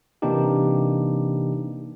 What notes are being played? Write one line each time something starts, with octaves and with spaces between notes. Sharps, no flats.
C3 E3 A#3 D4 D#4 G4